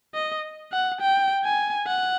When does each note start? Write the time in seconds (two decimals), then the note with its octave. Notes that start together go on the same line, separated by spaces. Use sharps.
0.15 D#5
0.72 F#5
1.01 G5
1.44 G#5
1.87 F#5